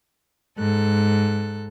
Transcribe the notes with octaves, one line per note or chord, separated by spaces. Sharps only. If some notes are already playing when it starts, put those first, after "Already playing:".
G#2 A4 F#6